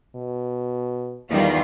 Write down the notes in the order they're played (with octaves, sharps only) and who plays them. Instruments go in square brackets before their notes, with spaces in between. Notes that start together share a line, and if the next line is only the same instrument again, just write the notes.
[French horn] B2
[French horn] E2 [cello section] D#3 G3 F4